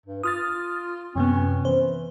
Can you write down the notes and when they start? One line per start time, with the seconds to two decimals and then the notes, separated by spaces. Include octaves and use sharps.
0.06 G2
0.23 F4 D#6 F6 A6
1.16 F#2 C3 B3 C#4
1.65 E3 C5